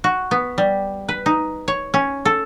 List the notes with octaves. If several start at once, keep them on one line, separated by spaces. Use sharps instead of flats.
F#4
B3
G3
B4
D#4
C#5
C#4
A4